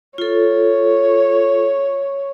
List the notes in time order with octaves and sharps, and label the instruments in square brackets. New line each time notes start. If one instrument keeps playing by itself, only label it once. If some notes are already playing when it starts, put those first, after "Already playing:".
[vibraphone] F4 A4 [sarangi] C#5